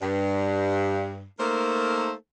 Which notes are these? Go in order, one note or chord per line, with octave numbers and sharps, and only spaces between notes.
G2
A3 A#3 D#4 A4 A#4 C5